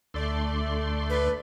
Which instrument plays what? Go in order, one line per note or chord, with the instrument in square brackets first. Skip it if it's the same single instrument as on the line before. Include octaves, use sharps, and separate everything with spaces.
[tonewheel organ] D2 C6 [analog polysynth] A3 D5
[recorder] B4